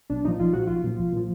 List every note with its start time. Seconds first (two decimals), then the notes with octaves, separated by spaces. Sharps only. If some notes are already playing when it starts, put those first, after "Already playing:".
0.10 B1 D4
0.25 A#2 F3 D#4
0.40 B1 F4
0.53 A#2 F3 F#4
0.67 B1 F4
0.84 A#2 F3
0.98 B1
1.13 A#2 F3